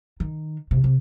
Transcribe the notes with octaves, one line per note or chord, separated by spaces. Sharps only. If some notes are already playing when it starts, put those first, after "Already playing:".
D#3
C3
C3